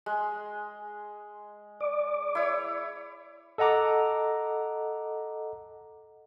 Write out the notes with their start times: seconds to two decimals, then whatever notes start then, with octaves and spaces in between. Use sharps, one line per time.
0.06 G#3
1.81 D5
2.35 E4 C#5
3.58 A4 D#5 F#5 A#5 D6